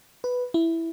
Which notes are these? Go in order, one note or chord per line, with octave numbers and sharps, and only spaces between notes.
B4
E4